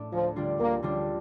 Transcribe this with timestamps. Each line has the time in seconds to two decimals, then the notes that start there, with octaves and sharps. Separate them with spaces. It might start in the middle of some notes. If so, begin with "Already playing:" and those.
Already playing: A2 A3 D4
0.12 D2 F3
0.36 D3 G3 D4 F4
0.60 D2 A#3
0.83 D3 G3 D4 F4